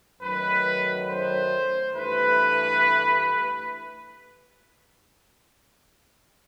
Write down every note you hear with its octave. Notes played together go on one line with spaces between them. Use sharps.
F#2 D#3 F#3 A3 B4
C5
G2 E3 A3 B4